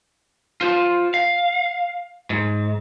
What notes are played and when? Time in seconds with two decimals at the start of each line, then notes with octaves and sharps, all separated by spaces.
0.61 F4 C5
1.14 F5
2.30 G#2